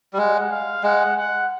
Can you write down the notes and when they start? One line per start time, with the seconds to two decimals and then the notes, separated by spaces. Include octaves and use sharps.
0.13 G3
0.18 G#3 F#5
0.51 F5
0.83 G#3 F#5
1.17 F#5